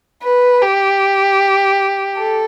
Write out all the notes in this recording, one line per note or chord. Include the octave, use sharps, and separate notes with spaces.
B4
G4
A4